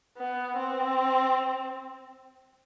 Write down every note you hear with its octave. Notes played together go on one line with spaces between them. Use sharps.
B3
C4